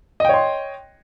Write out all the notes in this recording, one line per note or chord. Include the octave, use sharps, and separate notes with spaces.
C#5 D#5 G5 C6